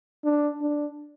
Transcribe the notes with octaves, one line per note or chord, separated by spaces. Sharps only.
D4
D4